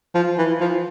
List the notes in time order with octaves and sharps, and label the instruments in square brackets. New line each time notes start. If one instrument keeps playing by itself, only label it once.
[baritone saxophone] F3
E3
F3